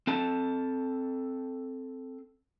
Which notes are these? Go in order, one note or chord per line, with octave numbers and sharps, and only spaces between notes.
C4 A4 A5